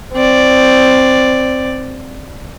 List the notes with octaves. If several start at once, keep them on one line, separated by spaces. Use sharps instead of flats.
C4 D5